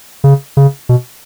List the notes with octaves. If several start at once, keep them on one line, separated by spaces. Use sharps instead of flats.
C#3
C#3
B2